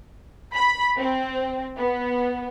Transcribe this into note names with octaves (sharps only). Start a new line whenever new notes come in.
B5
C4
B3